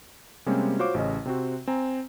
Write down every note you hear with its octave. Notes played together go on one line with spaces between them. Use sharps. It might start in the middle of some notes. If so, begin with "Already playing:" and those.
C3 G3 G#3 A#3 C4 C#4
F4 F#4 C5 C#5 F5 D6
A1 C#3 C#4 D#5
C3 C4 F#4
C4 G#5 A#5